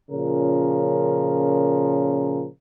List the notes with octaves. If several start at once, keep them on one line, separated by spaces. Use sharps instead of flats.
A#2 C#3 F3 C#4 A#4